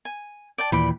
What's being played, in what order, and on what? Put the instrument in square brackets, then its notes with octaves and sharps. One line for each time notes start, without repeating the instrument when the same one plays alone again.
[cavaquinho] G#5
D5 G5 A5
[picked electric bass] D#2 A#2 E3 [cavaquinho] D5 G5 B5